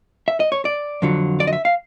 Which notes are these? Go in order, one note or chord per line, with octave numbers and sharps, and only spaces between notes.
E5
D#5
C#5
D5
F2 D3 F#3
D5
D#5
E5
F5